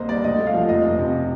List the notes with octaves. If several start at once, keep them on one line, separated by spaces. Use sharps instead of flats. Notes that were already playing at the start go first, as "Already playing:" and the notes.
Already playing: C2 A#3 C5 D#5
G3 D5
D2 D#5
A3
F5
F3
F1 D#5
F1
C3